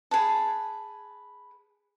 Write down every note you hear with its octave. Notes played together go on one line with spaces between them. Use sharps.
G#4 B4 A5